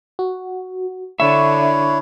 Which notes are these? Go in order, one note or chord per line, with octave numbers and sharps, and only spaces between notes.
F#4
D3 D4 E4 C#5 E5 C#6